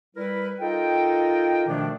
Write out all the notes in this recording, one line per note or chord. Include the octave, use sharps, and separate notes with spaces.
G3 E4 A#4 B4
D#4 F4 A4 A#4 D#5 G5
B2 D#3 F3 A3 D4